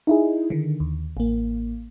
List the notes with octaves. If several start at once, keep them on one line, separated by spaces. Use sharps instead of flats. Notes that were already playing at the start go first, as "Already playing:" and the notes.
D#4 E4 G#4
D3 D#3
D#2
A1 A#3